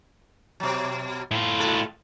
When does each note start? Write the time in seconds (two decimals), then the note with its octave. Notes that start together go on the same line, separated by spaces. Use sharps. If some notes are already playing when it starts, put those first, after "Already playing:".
0.60 B2 F#3
1.31 A2 F4
1.59 A#2 A4